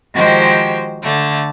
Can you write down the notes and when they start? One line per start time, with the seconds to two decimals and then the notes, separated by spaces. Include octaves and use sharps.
0.15 D#3 F3 G#3 F#4 G4 C5
1.02 D3 A3 A5